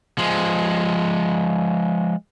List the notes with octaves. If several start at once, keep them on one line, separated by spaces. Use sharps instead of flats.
F3 G#3